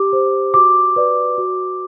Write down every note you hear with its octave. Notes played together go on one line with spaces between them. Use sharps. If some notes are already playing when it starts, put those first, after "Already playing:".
Already playing: G4 D6
C5
F#4 D6
B4 D5
F#4